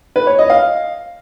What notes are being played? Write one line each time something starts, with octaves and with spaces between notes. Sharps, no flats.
B4
C#5
D#5
F5